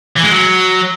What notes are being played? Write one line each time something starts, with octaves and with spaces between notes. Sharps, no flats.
E3
G#3
F#3